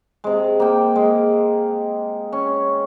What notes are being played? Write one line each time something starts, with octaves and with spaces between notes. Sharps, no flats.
C3 G#3
A#3 G5
G#3
C#4